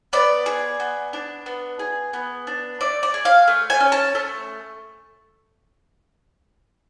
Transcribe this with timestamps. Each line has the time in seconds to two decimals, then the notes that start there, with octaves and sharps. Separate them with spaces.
0.13 B3 D5
0.46 G#4
0.80 B3
1.13 D4
1.46 B3
1.79 G#4
2.13 B3
2.47 D4
2.81 A3 D5
3.03 D5
3.14 G#4
3.25 F5
3.48 A3
3.70 G#5
3.80 C#4
3.92 A5
4.15 A3